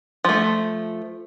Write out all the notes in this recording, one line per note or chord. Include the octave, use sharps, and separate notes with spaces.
F3 A3